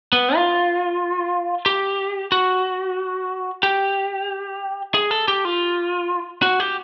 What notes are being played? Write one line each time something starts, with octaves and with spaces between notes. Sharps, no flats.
B3
F4
G4
F#4
G4
G#4
A4
G4
F4
F#4
G4